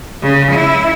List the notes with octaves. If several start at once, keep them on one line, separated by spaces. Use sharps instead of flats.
C#3
E4